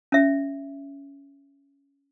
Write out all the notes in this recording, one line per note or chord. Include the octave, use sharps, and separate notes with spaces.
C#4 E5